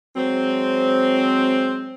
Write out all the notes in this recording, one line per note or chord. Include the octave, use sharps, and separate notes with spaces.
F#3 G#3 C4